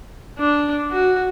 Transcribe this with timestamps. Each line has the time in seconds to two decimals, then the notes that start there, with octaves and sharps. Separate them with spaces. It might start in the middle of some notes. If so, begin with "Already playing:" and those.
0.38 D4
0.91 F#4